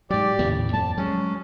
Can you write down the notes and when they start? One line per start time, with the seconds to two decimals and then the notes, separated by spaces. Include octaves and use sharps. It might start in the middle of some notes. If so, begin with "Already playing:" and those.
0.10 G#2 F#3 G4 D5
0.39 D#2 A2 C#3
0.73 F2 A5
0.98 F#3 G#3 C#4